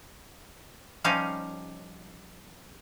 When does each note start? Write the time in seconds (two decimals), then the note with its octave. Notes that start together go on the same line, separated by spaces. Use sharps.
1.04 F3 G3 C#4 D#4 F5